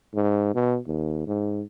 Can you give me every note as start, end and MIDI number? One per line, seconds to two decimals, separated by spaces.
0.14 0.51 44
0.54 0.78 47
0.87 1.26 39
1.27 1.62 44